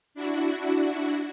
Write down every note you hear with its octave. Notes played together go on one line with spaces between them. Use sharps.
D4 E4 F#4